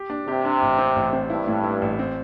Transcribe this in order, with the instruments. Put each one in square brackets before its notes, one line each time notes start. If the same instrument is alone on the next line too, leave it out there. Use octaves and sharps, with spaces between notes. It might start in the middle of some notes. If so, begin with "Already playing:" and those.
Already playing: [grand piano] G4
D4
[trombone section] C3 [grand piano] G4
[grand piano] D4
A1
C4
A1
C4
[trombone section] G2 [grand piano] E4
[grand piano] A2
E4
A1
C4